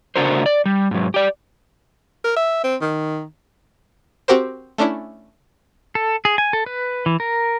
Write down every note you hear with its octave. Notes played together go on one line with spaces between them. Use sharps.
C#3 A3 D4 F#4 A#4 C5
D5
G3
G#2 F#3
G4 D5
A#4
E5
C4
D#3
C4 F#4 G4 A#4 C5
A3 C#4 D4 E4
A4
G#4
G#5
A4
B4
E3
A#4